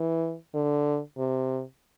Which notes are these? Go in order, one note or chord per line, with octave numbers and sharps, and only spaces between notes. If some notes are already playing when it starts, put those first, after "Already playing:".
Already playing: E3
D3
C3